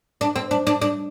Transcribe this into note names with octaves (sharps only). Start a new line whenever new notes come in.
D4
C4
D4
D4
D4